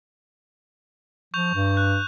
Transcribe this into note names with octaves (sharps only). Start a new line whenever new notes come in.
F3 C#6 G6 F7
G2
F#6